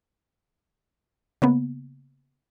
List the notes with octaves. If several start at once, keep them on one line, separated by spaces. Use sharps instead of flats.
C#3 A#3 B3